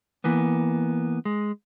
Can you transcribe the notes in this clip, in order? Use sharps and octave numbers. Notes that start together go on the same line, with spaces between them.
E3 A#3 B3
G#3